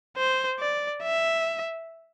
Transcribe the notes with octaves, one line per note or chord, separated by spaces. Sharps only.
C5
D5
E5